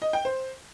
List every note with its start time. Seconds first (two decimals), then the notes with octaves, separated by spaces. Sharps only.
0.02 D#5
0.13 G5
0.25 C5